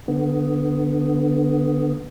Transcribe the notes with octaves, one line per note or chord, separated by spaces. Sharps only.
D3 B3